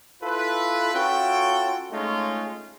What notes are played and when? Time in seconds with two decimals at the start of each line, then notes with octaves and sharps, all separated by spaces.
0.23 E4 F4 A4 B4
0.95 C#4 F4 F#4 A4 G5
1.91 G#3 A3 C#4 D#4 F4